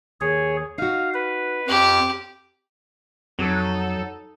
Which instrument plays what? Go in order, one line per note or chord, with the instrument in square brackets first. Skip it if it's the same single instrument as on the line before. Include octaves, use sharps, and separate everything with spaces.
[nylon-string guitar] D#2 [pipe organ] G#4 C#5
[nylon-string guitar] D#4 F#4 [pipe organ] F5
[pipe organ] B4
[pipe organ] F2 [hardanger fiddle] G4
[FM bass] F2 [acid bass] F#3 [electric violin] D#4 A4